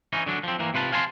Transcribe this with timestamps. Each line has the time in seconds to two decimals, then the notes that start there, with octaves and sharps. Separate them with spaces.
0.13 E3 C#4 D#4
0.26 D3 F#3 D4
0.43 F3 C4
0.59 E3 A#3
0.74 C3 F4 B4 F5 A5
0.92 F5 G#5 A5 C6